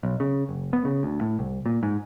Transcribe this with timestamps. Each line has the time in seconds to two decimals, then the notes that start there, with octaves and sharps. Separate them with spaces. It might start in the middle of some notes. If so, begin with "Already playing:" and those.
0.03 B1
0.20 C#3
0.49 F#1
0.73 B3
0.85 C#3
1.03 D2
1.21 A2
1.39 C2
1.66 A#2
1.83 G#2